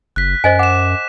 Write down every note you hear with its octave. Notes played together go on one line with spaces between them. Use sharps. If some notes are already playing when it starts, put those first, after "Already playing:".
F#1 F#6 B6
F#2 C5 D#5 G#5
F#5 D6 E7